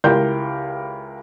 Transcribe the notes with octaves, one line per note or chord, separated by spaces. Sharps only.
C#2 E4 G4 A#4 C6 G6